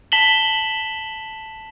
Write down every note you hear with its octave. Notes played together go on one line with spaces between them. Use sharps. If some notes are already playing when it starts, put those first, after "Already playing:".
A5 B6 E7 F#7 G7